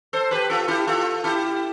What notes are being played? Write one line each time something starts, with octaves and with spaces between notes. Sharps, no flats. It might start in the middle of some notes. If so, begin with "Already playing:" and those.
A4 C5
G4 B4
F4 A4
E4 G4
F4 A4
E4 G4